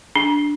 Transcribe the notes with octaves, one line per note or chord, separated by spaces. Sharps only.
D4